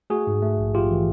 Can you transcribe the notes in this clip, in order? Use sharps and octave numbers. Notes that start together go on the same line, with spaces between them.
A3 F#4 G#4
G#2
A3
A#1
A#1 F4 G4
E3